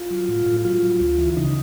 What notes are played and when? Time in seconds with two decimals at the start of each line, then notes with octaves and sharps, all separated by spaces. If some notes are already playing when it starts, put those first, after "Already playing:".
Already playing: F4
0.11 F#3
0.29 A2
0.46 A2
0.64 F#3 F4
0.82 F#3
1.00 D2
1.18 E3
1.37 C#3 D#4